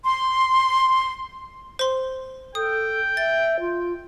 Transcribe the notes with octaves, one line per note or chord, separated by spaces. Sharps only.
C6
C5 C6
A4 G5 D#6
E5 A6
F4